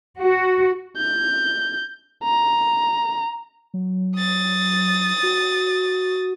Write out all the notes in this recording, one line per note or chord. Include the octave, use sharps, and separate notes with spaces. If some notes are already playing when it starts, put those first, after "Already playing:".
F#4
G6
A#5
F#3
D#6 A6
F#4